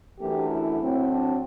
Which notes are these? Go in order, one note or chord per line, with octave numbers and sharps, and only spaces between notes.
F#2 E3 A3 D4 G4
E4
A2 F#3 C4
D4